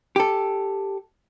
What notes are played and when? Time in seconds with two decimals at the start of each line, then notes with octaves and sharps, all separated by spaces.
0.16 G4 A4